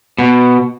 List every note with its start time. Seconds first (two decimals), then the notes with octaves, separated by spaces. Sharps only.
0.18 B2